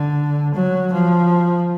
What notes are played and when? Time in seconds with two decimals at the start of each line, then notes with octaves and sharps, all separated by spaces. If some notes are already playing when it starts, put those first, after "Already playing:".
Already playing: D3
0.54 F#3
0.92 F3